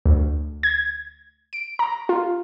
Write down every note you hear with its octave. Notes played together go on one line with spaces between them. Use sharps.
D2
G#6
D7
A#5
F4